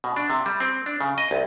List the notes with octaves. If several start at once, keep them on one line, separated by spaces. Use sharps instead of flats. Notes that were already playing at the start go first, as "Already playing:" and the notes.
B2
D4
C3
G3
C4
D4
C#3
D#5
C2